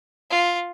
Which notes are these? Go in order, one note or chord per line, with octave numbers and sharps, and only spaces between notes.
F4